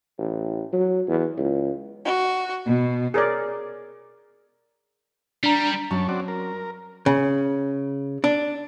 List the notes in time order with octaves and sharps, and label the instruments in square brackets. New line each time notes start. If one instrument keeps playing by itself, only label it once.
[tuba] A1
F#3
E2
C#2
[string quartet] F#4
B2
[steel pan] G#4 A#4 C#5 D5
[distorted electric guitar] G3 [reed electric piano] D4 A#5
[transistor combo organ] F#2 A5 C#6 [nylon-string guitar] F#3 C#4 D4
[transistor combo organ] C4 F#4 D5
A#4
[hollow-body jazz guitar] C#3
D4